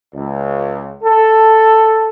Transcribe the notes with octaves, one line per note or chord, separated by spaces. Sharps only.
C#2
A4